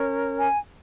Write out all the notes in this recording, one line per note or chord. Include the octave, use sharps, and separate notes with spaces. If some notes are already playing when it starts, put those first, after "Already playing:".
Already playing: C#4 A#4 C#5
G#5